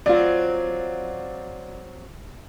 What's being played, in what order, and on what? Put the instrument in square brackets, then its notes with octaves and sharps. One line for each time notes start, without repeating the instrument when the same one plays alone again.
[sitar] F#3 C4 [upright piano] F4 D5